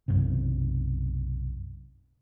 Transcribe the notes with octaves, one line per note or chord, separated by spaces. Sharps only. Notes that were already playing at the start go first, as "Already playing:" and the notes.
B1 F#2 C3